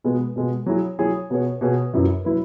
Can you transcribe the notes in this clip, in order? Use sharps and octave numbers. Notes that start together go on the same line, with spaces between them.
B2 G#3 B3
B2 G#3 B3
F#3 E4 G#4 C#5
F#3 E4 G#4 C#5
B2 B3 G#4 C#5
B2 B3 G#4 C#5
F#2 F#3 E4 B4
F#3 E4 B4